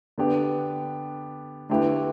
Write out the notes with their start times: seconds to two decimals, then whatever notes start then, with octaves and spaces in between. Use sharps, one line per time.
0.18 D3 B3 D4 G4
1.70 D3 A3 E4 G4 B4